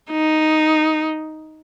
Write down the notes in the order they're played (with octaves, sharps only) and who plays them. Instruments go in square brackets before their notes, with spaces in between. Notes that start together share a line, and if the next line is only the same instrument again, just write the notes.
[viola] D#4